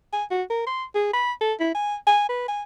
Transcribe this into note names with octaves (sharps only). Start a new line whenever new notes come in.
G#5
F#4
A#4
C6
G#4
B5
A4
E4
G#5
G#5
B4
G#5